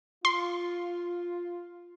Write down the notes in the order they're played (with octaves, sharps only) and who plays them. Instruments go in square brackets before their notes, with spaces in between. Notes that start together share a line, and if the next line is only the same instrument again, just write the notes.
[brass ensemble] F4 [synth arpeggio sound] C6